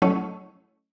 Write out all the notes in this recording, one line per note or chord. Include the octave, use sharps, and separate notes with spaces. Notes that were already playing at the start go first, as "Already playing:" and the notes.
F#3 A3 C#4 E4 C#5 D#5